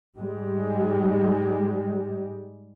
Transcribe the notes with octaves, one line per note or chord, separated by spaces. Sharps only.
G#2 G3 G#3